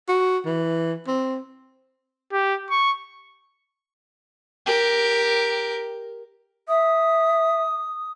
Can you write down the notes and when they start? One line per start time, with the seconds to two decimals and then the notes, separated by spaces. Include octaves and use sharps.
0.08 F#4
0.46 E3
1.07 C4
2.32 G4
2.70 C#6
4.67 G4 A#4
6.68 E5 D#6